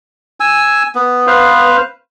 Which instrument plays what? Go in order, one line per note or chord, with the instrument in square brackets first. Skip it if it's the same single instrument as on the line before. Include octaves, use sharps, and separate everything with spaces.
[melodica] G#5 E6
B3
[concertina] B4 C5 F5